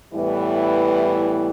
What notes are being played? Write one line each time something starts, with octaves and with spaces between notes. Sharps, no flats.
A2 E3 G3 B3 E4